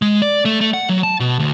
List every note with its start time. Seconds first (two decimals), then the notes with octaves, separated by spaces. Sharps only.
0.02 G#3
0.22 D5
0.45 A3
0.61 A3
0.73 F#5
0.89 F#3
1.03 A5
1.20 B2
1.39 D2